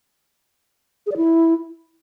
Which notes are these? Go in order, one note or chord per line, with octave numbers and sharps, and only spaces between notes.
G#4
D5
E4